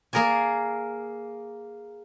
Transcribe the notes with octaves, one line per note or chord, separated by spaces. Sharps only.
A#3 G#4 A#4 D5 G#5